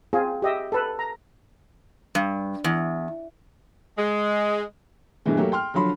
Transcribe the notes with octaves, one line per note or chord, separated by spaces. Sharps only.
C4 F4 G#4
G4 D#5 E5
A4 B4
A#5
G2
E2
G#3
G2 B2 D3 E3 G#3
F#3 A3 A#3 G4
G5 C6 F6
D3 F3 F#3 B5 C6